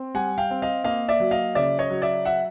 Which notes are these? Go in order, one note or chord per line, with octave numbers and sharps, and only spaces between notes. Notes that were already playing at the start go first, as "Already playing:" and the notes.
Already playing: C4
G3 F#5 G#5
F5 G5
C4
D#5 F5
A#3 D#5 F5
D5 E5
F#3
D#5 F5
C#3 D5 E5
C#5 D#5
F#3
D5 E5
E5 F#5